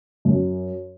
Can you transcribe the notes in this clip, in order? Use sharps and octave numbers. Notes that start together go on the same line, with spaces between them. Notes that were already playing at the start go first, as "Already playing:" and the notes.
F#2